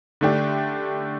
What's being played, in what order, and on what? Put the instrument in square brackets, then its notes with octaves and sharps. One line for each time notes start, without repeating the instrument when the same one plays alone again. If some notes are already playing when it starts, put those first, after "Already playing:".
[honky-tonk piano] D3 A3 D4 G4